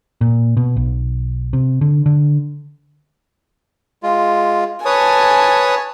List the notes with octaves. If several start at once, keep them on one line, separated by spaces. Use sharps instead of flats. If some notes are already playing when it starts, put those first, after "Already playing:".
A#2
B2
B1
C3
D3
D3
G#3 F4
B4 C#5 G#5 A5 D#6